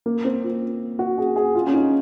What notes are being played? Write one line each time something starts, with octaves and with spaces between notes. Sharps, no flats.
A#3
C4
F4
F#4
G#4
G#4
F4
C#4
D#4